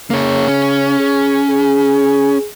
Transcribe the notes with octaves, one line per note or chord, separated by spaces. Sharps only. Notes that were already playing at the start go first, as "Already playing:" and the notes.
C#3 A#3 C#5
C#4
G#4
G#4